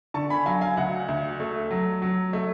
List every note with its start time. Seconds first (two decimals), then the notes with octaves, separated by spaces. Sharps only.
0.14 D3 A5 C#6
0.30 G#5 B5
0.46 F#3 F5 G#5
0.61 F5 G#5
0.77 D2 F#5
1.08 D2
1.40 A3
1.71 F#3
2.02 F#3
2.33 A3